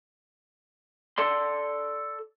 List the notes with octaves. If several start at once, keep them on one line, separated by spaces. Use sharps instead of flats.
A4 D5 C6